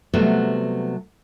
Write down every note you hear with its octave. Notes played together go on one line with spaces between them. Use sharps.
C3 F#3 G3 A3 B3